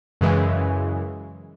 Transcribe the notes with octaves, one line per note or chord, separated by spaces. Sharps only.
F#2 C#3 E3 G#3